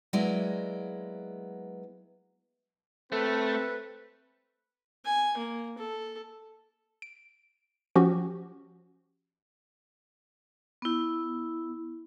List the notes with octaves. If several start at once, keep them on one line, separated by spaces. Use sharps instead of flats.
F#3 G#3 A#3 B3 E4 D5
A3 C4 A4 B4
G#5
A#3
A4
D7
F3 C#4 F#4 G4
B3 E4